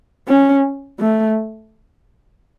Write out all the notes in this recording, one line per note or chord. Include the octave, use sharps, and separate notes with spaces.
C#4
A3